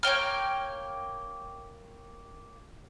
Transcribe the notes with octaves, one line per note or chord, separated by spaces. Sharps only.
A#3 C#5 G5 F6